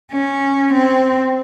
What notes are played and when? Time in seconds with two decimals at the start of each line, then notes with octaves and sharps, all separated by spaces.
0.12 C#4
0.73 C4